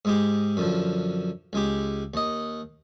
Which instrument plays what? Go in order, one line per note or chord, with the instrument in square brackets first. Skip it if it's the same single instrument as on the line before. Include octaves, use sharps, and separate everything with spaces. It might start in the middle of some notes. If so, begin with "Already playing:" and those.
[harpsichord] G#2 G#3 G4
F#2 D3 F3
C#2 G#3 G4
D#2 D#5